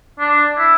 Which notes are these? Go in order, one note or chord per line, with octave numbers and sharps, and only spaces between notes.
D4
E4